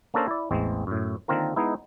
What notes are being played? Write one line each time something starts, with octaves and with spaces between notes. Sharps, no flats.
A#3 C#4 D4 A4 A#4 C5
E4 D5
A1 E2 G#3 C4
F#2 A2
D3 D#3 A#3 C4 F4 A#4
G#3 B3 D#4 E4